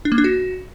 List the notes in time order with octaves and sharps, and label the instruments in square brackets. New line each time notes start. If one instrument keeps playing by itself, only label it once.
[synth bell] D4
A#3
D4
F#4